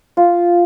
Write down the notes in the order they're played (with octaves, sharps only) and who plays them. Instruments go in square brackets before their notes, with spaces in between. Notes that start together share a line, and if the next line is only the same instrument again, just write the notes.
[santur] F4